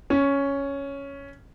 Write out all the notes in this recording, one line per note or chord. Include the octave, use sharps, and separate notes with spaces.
C#4